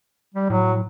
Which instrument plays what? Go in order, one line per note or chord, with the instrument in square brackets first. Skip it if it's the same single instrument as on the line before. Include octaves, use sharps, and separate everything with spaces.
[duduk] G3
[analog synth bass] A2 [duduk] F#3